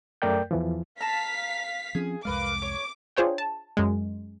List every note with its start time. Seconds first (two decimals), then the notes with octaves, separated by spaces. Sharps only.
0.22 F#2 A3 A#4 D5 G5 G6
0.51 E2 E3 F3
1.01 F5 A5 A#5 B6
1.95 F3 C4 C#4 G#4
2.25 C2 F2 G#3 A#4 B4 F5 D6
2.62 C#5
3.17 D4 F4 G#4 C5 C#5 G5
3.38 A5
3.77 F#2 G#3